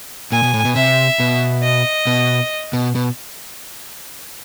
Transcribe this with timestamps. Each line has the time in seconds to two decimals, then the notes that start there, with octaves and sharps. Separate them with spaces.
0.32 A#2 G#5
0.43 B2
0.54 A2
0.65 B2
0.76 C3 E5
1.20 B2
1.63 D#5
2.07 B2
2.73 B2
2.95 B2